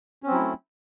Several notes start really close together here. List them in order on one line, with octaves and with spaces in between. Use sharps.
C#4 C4 F#3 E4 A3